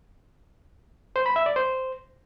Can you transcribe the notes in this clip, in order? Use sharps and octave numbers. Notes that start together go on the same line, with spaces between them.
C5
B5
E5
D5
C5